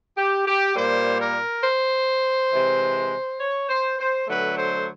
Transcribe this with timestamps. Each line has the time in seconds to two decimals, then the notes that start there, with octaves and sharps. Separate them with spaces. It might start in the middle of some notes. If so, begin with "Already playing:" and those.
0.17 G4
0.47 G4
0.76 A#2 G3 A#3 C5
1.20 A#4
1.64 C5
2.52 C3 E3 G#3
3.40 C#5
3.69 C5
3.99 C5
4.27 D3 F#3 A3 B4
4.56 C5